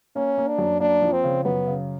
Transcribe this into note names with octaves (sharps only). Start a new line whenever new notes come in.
A#3 C#4
A#3
D4
F#2
A#3 D4
F3
C4
C#3
F#2 B3
C#3